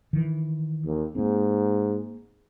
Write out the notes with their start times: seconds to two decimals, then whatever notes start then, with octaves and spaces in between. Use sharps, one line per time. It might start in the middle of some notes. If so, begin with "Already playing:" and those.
0.13 D#3 E3
0.85 D#2
1.15 G#2 A#3 C4